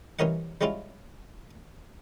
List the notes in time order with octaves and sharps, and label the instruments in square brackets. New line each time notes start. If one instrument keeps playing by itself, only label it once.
[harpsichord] C2 E3 C#4 A#4 D#5 F#5
G3 G#3 C#4 E4 F4